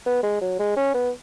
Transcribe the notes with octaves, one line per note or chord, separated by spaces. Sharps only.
B3
G#3
F#3
G#3
C#4
B3